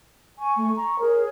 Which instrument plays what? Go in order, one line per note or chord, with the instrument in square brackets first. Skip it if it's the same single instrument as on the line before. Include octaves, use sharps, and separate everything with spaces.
[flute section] G#5 C#6
[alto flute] A3
[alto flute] A#5 [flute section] C#6
[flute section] G#4 C#5 [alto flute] A#4